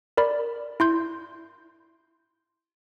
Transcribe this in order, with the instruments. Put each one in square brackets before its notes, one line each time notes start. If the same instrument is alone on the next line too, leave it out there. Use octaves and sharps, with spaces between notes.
[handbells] A#4 D5 B5
E4 C6 G6